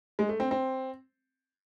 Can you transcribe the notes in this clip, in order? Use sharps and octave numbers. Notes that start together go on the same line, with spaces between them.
G#3
A3
C4
C4